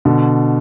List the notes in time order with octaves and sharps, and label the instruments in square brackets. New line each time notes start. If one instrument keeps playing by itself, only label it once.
[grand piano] B2 D3